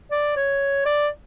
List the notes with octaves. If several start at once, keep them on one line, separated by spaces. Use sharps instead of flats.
D5
C#5
D5